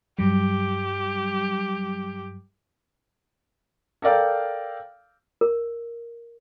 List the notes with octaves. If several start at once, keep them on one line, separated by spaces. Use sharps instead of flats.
G2 F#3 G3 G4
A4 A#4 D5 F5 G5
A#4